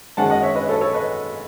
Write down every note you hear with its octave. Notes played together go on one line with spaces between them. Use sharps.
F#2 D#3 G#3 C#4 F#5 A5
D#5 F#5
C#5 E5
B4 D#5
A4 C#5
A4 C#5
B4 D#5